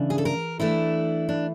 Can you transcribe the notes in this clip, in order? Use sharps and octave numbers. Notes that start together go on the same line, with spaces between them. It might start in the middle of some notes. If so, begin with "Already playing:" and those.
Already playing: C#3 E3 A3 D4
G#4
A4
A#4
E3 A3 D4 E4
D4